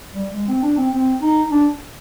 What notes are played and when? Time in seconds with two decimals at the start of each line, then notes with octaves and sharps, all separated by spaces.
0.13 G3
0.33 G#3
0.48 C4
0.62 D4
0.77 C4
0.93 C4
1.21 D#4
1.51 D4